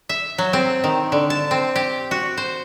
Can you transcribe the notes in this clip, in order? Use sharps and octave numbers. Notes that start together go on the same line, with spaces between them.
E5
F#3
C4
D#3
D3
A5
C4
G4
F#4
C5